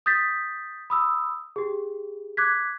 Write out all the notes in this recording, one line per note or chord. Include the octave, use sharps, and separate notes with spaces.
D#6 G6 A6 B6
B5 D#6 E6
G4 G#4
D6 F#6 G#6 B6